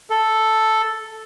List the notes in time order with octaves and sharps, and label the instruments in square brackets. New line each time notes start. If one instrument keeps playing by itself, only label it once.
[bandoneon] A4